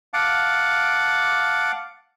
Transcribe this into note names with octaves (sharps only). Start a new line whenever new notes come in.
F5 F#5 A5 D6